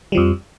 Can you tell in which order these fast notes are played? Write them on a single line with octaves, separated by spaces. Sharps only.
G3 F3 F2